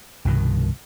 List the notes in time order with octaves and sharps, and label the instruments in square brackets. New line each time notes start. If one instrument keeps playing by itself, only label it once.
[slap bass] C2 G2 B2 D#3